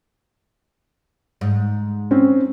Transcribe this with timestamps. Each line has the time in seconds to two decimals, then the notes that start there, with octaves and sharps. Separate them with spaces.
1.41 G#2
2.11 C4 C#4